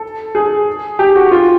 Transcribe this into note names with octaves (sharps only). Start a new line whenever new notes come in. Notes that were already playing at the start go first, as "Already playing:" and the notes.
Already playing: A4
G#4
G4
F#4
F4